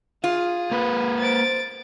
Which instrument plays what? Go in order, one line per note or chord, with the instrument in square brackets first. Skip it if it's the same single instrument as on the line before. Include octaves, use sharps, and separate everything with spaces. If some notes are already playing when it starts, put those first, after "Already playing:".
[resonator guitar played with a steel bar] F4 [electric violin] G#4
[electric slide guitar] A#3 B4
[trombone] C5 [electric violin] A6 D7